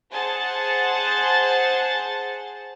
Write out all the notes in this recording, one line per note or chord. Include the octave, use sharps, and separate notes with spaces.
G#4 C5 F#5 A5 A6